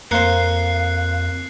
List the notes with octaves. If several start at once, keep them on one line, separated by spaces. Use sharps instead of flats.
F2 A#3 C5 F5 F#6 C7 C#7